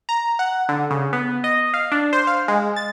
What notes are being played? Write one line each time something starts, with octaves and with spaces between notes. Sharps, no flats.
A#5
F#5
D3
C#3
B3
D#5
F5
D4
C5
F5
G#3
A6